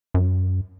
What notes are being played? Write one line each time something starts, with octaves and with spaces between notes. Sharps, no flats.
F#2